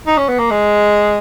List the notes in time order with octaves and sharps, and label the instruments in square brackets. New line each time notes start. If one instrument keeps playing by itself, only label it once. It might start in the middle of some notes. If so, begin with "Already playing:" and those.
[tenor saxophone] D#4
C#4
B3
A#3
G#3